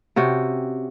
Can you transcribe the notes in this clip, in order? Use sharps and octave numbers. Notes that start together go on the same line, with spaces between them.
C3 C#4 F#4 G5